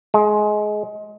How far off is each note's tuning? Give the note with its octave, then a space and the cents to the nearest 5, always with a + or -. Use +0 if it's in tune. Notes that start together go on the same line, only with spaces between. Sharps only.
G#3 +20